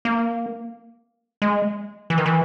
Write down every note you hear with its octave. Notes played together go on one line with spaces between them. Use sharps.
A#3
G#3
E3
D#3
E3